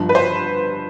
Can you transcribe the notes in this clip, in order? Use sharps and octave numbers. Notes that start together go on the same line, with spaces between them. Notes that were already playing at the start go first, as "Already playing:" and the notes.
Already playing: G1 G2 D3 F3
B4
C5